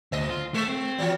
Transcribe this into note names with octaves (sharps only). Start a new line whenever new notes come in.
D2 A#3 D#5
F4
G#3 A3
C4
E3 F#3